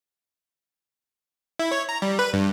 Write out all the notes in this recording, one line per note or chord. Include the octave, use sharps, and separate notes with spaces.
E4
C#5
A#5
G3
B4
G2